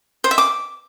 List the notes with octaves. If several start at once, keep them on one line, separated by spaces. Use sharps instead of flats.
C5
E5
D6